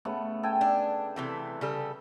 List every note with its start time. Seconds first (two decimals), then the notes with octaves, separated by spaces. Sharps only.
0.05 C#3 A3 B3
0.43 A4 G5 G#5
0.61 D4
1.16 C3 E3 A3
1.61 C#3 G3 A4